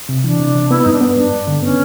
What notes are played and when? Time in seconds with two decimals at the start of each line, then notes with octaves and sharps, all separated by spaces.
0.09 C3
0.24 E3 D4
0.40 C3
0.55 C3
0.70 B3 E4
0.82 G2 D#4
0.93 D4
1.01 B3
1.12 C#4
1.17 G2 D4
1.32 G2
1.48 D3
1.63 B3 C#4